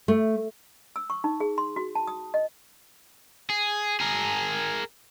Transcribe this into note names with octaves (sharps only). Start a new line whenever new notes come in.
A3
E6
C#6
D#4
G#4
C6
F#4
A5
D#6
D#5
G#4
G#4 A#4